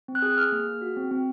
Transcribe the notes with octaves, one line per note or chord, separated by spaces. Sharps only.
C4
F#6
G#4
G#4 F6
A#3
G#4
F#4
C4
C4